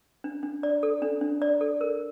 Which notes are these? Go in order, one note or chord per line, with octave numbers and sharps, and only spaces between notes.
D4
D4
D5
A4
D4
D4
D5
A4
A#4